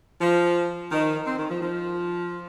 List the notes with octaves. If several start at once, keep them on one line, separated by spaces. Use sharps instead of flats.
F3
D#3
C4
D#3
F3
F3